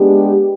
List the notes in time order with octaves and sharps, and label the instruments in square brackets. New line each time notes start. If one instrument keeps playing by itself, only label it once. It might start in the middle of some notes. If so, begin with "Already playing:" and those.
Already playing: [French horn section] G#3 B3 D4 G4